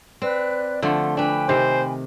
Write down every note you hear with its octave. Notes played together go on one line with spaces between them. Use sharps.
C4 B4 D5 F#6
D3 F3 A3 F#5 C6
D4 B4 G5 G#5 B5
C3 D#3 C5